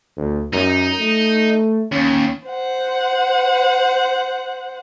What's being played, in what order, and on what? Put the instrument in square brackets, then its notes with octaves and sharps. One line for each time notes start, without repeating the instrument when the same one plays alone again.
[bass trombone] D2
[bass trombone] F#2 [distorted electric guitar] D#4
[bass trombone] A3
[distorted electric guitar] D#2 [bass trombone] C#4
[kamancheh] C5 F#5